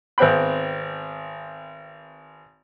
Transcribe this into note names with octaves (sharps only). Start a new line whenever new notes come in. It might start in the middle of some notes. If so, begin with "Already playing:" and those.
G#1 B3 C4 G5 B5